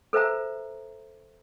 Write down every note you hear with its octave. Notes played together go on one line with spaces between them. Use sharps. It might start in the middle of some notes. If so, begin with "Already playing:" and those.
A4 B4 C5 E5 A#5